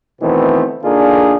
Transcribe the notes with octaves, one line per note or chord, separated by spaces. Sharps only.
B2 D#3 E3 A3 B3 C4
D3 A#3 D4 D#4 F4 G#4